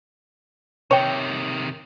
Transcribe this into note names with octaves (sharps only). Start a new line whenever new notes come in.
C3 D#3 C#5 G5